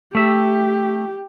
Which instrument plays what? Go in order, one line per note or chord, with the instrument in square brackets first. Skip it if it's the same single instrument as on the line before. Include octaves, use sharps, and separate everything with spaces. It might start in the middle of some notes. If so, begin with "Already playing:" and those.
[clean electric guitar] A3 E5 [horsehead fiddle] G4